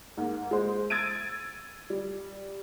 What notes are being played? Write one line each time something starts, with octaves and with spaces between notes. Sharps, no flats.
G#2 A#3
G#3 C5
E6 G#6 A6 D7 D#7
G3